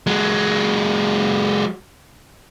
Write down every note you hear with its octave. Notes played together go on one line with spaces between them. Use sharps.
F#3 G#3